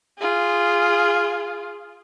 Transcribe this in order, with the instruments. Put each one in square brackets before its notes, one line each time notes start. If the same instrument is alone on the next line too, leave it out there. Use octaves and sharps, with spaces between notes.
[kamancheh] F4 G#4